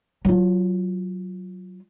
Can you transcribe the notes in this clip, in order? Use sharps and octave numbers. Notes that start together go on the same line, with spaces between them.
F#3 F4